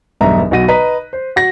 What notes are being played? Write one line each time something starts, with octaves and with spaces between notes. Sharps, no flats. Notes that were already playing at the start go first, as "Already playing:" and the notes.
E1 B1 G2 B3 E5 A#5
B1 B2 F#4 A#6 D#7
B4 D#5 A#5 B6
C5
F#4 A#6